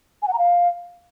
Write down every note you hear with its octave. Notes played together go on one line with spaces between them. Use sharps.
G#5
F#5
A#5
F5